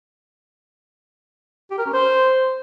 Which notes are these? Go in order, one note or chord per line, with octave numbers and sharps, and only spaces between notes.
G4
A#4
C#4
C5